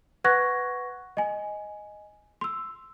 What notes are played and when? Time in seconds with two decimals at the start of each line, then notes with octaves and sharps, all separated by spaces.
0.24 B4 F#5 C#6 F#6 G#6 A#6
1.17 D#5 G#5
2.41 C6 E6